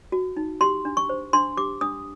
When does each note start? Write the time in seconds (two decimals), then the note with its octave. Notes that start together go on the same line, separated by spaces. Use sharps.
0.12 F#4
0.37 D#4
0.61 G4 C6
0.85 D4
0.97 C#6
1.09 C5
1.33 D4 C6
1.57 G4 D6
1.81 D4 D#6